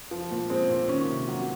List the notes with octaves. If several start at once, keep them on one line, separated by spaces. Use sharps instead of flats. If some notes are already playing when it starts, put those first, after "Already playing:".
F3
A#2
G#3 C4
A#2
D#3 C#4
C3
F#3